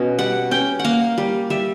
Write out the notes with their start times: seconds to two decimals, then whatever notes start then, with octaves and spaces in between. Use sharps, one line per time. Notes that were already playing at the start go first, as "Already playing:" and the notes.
Already playing: B2 C#4 D#5
0.19 G3 F#5
0.51 C#4 G5
0.79 F#5
0.84 A#3 F5
1.18 G3
1.50 G3 E5